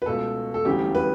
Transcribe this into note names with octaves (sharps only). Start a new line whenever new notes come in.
B4
C#2 B2 A3 A4
A4
E1 D2 C#3 E3 G3 G4
B4